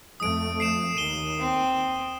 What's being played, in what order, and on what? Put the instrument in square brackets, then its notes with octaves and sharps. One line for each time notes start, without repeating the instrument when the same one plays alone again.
[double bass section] F2 A3 [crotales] D#6 D7
[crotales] C7 D7 E7
[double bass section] D#2 [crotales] D#7 G7
[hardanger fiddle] C4